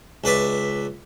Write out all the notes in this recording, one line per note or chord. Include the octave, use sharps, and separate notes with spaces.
C#2 B4 D5 E5